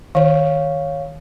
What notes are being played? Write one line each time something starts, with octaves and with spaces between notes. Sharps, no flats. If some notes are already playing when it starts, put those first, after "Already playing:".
D#3 C#5 F5